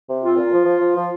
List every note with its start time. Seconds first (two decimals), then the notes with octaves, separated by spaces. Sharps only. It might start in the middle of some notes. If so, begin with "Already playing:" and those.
0.08 C3
0.22 C4 F4
0.38 A#2
0.52 F3
0.66 F3
0.81 F3
0.96 F3